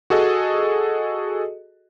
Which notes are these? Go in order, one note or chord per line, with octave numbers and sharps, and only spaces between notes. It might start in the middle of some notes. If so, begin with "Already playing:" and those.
F#4 G#4 A4 D#5